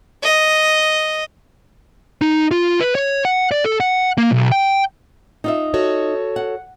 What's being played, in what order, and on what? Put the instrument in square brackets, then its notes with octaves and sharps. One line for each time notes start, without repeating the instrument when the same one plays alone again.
[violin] D#5
[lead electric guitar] D#4
F4
B4
C#5
F#5
D5
A4
F#5
A#3
B1
G5
[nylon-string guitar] D#4 F4 E5
[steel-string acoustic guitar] F#4 A4 C#5
[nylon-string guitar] F#5